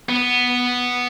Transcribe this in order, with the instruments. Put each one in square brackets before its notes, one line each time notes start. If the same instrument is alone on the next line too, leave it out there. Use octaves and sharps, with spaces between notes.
[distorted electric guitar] B3